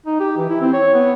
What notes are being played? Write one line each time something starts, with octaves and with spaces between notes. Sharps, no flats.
D#4
G4
E3
E4
C4
C#5
B3